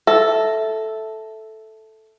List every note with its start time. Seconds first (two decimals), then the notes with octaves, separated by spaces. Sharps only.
0.07 A4 E5